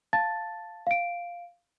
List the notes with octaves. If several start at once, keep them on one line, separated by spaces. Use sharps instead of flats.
F5 A5 A6
F5 D7